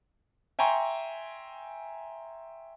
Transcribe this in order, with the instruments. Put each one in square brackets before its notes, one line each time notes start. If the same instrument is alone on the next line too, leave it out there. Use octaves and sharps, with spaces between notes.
[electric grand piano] E5 G5 G#5 A#5 C6 C#6